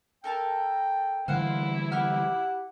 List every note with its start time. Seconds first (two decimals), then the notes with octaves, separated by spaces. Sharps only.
0.24 A4 A#4 G5 A5
1.28 D3 E3 G3 E4 C5 F5 F#5
1.92 G4 F#5 C#6 F6